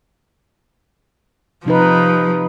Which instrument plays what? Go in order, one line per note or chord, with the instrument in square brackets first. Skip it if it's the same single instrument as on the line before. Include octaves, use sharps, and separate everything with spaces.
[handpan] C3 D#4 B4 [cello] F3